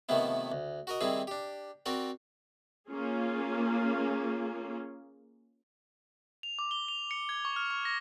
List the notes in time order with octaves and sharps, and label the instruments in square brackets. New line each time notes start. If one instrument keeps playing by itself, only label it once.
[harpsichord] C3 D#3 F3 A3 B3 E4
D2
F#4 A#4 D#5
D#3 G3 C4 E4 G#4
D4 G4
C4 F#4 A#4 D5
[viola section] A#3 C#4 F4 G#4
[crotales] F7
D6
G7
F7
C#7
G#6
C#6
F6
C#6
A#6